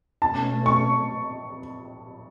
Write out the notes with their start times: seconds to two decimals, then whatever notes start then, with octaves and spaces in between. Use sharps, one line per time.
0.22 B2 A3 C#4 A5
0.66 C#6